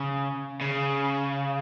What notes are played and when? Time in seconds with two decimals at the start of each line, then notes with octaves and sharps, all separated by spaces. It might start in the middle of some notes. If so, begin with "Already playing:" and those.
Already playing: C#3
0.61 C#3